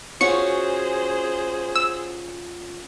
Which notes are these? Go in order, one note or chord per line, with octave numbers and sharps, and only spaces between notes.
C#4 F4 F#4 G#4 C5 C#6
E6